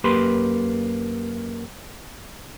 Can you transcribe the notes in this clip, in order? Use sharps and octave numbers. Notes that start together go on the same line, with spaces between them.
F#2 A#3 G4 B4 B5 C6